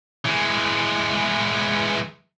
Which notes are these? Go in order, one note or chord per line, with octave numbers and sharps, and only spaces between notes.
E3 G#3